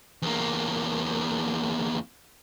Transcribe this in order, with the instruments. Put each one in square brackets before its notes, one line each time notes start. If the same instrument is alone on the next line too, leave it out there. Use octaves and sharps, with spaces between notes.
[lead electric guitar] E2 A#3